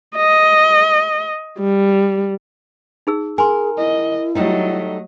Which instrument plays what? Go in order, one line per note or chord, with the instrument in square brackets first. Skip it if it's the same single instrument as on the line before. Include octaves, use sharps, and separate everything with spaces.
[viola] D#5
G3
[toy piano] D#4 G#4 E6
[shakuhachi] G#4 [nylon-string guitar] A#4 [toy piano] G#5 C6
[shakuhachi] E4 [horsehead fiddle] D#5
[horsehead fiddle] F#3 D#5 [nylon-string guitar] G3 A3 D#4